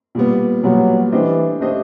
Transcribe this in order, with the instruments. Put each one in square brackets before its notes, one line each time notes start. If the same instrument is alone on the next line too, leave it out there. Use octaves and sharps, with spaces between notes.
[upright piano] A#2 G3 B3
[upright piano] A#2 G3 B3 [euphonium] F#3
[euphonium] E3 [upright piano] A3 D4 G4 C5 D#5
[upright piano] A3 D4 G4 C5 D#5